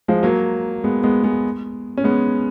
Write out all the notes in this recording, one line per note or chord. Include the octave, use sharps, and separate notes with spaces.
F3 G#3
F#3 A#3
G#3 B3
G#3 B3
G#3 B3
C#4
G#3 B3